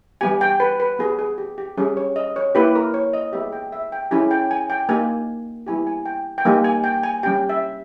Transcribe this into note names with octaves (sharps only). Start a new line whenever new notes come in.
G3 B3 G4 G#5
G5
B4
B4
B3 G4 G#4
G#4
G4
G4
G3 C#4 G4 G#4
C#5
D#5
C#5
A#3 E4 G4 B4
A#4
C#5
D#5
G#3 B3 G4 E5
G5
E5
G5
G#3 C#4 E4 G4 G#5
G5
G#5
G5
A#3 D#4 G4 G#5
G3 B3 E4 G4 G#5
G#5
G5
G5
G3 A#3 D#4 G4 G#5
G#5
G5
G#5
G3 C#4 G4 G5
E5